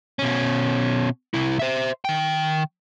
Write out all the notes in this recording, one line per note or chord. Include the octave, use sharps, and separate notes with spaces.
B2 C#4
C2 E4
C5 E5
D#3 G5